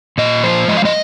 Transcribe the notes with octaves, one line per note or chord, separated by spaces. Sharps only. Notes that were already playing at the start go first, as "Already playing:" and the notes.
A#2 D#5
F3 C5
G#3 D#5
F5
D#5